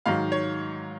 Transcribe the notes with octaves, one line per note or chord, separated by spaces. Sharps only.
G#2 D#3 F#3 F5
C#5